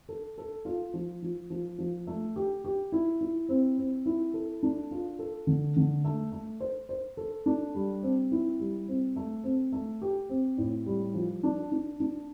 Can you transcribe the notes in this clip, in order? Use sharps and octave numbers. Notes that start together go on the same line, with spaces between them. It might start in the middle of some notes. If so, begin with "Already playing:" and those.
A4
A4
F4
F3
F3
F3
F3
A3
G4
G4
E4
E4
C4
C4
E4
A4
D4
F4
A4
D3
D3
A3
A3
C5
C5
A4
D4
G3
C4
E4
G3
C4
A3
C4
A3
G4
C4
A2
G3
F3
D4
D4
D4